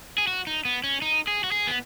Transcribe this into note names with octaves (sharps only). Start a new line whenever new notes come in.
G#4
F#4
D#4
B3
C#4
D#4
G#4
F#4
G#4
B3